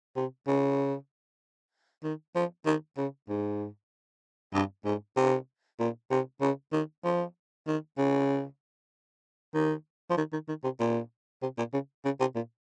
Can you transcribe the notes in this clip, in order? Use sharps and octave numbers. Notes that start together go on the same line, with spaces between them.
C3
C#3
D#3
F3
D#3
C#3
G#2
G2
G#2
C3
A#2
C3
C#3
D#3
F3
D#3
C#3
D#3
F3
D#3
D#3
D#3
C3
A#2
C3
A#2
C#3
C#3
C3
A#2